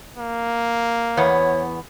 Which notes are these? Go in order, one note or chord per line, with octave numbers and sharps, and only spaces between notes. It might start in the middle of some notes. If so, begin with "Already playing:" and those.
A#3
E2 B3 C#5